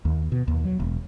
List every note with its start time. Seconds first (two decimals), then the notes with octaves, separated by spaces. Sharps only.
0.05 D#2
0.32 B2
0.48 D#2
0.64 F#3
0.80 E1